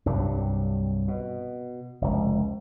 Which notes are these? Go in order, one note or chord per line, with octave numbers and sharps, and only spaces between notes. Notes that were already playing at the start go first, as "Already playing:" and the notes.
C2 G2 F#3 G3
B2
F1 C#2